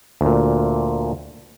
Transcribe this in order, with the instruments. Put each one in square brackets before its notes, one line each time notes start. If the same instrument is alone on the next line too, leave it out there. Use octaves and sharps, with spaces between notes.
[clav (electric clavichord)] D2 A#2